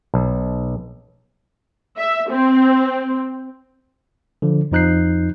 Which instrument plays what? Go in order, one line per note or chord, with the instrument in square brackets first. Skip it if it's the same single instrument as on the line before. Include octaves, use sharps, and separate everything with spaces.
[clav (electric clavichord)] B1
[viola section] E5
C4
[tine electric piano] D3 F3
F2 F3 D#4 F#6 G6 C7